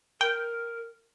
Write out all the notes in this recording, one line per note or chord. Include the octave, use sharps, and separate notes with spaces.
A#4 G5